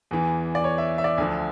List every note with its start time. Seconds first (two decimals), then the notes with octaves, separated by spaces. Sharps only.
0.11 E2 E3
0.55 D5
0.64 C#5
0.78 E5
0.98 E5
1.04 D5
1.18 D2 D3 F3